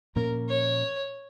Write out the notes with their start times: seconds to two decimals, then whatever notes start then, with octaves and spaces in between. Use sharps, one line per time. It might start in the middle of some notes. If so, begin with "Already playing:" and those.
0.16 A#2 F3 A#3 C#4 A#4
0.49 C#5